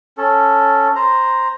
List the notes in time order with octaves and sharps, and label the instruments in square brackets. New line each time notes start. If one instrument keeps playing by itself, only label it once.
[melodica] C#4 A4
C5 A#5